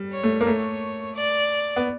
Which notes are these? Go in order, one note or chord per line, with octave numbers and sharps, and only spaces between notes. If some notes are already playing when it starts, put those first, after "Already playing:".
Already playing: G3
C#5
A3
A#3
A3 C#5
D5
B3